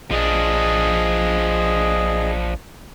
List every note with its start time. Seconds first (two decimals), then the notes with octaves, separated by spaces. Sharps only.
0.11 A#1 F3 D4 G#4 D#5